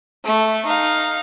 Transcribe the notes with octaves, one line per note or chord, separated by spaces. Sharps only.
A3
D#4 F5